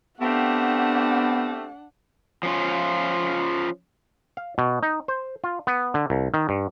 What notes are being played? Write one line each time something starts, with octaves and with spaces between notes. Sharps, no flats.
A3 B3 C4 D4 F4 G4 F#5
F3 C#4 F4
F5
B2
D#4
C5
F4
B3
D3
C2
D#3
G2